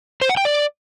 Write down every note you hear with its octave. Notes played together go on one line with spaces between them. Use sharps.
C5
F#5
G5
D5